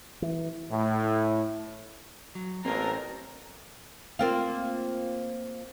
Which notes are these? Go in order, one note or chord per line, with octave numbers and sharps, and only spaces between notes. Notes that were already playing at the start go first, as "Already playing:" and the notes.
E3
A2
F#3
A1 A#3 C4 C#4 F4 A#4
A#3 C4 F4